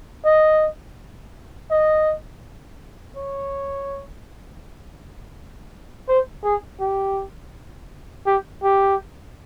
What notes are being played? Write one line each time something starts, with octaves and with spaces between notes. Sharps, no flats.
D#5
D#5
C#5
C5
G#4
G4
G4
G4